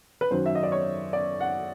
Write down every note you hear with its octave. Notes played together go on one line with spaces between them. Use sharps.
B4
F#2 D#3 F#3 C5
E5
D#5
D5
C#5
D5
F#5